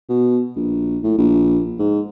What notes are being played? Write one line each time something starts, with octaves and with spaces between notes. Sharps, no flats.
B2
A#1
A2
A#1
G#2